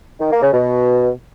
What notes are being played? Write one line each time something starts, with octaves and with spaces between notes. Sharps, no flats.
D#3
A#3
C#3
B2